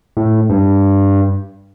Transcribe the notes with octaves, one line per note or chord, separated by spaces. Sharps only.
A2
G2